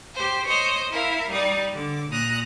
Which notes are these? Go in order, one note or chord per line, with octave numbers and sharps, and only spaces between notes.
G4 C5
C5 C#5 D#5
E4 A#4 F5
G3 D#4 D5
D3 D6
A#2 A#5 D#6 F#6